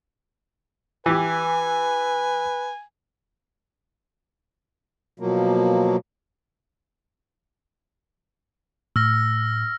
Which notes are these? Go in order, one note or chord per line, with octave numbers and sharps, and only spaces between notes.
E3 G4 B4 G#5
B2 F3 F#3 A#3
A2 E6 F6 A#6